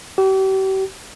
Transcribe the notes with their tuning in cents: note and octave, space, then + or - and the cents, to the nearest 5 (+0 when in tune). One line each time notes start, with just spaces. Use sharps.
G4 -40